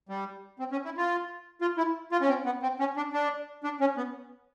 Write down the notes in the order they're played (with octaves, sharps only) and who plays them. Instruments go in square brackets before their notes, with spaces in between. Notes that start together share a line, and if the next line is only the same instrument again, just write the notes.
[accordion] G3
C4
C#4
E4
F4
F4
E4
F4
C#4
C4
B3
C4
C#4
D4
D4
D4
C#4
B3